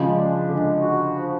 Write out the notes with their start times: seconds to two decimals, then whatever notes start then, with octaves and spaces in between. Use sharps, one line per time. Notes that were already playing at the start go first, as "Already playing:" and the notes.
Already playing: C#3 F3 G#3
0.16 D4
0.49 D3 G#3
0.81 F#4
1.15 F3